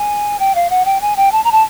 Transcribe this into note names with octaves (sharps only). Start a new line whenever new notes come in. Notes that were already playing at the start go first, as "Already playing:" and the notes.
Already playing: G#5
G5
F5
F#5
G5
G#5
G5
A5
A#5
A5